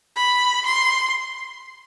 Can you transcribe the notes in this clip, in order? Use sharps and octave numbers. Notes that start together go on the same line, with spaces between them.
B5
C6